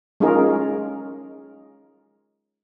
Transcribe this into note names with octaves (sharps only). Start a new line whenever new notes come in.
G#3 C#4 D#4 F4 G#4 A#4